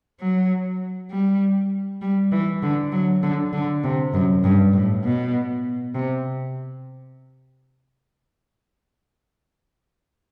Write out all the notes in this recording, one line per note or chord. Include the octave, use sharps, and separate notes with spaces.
F#3
G3
G3
E3
D3
F#3
D3
D3
C3
F#2
G2
A2
B2
C3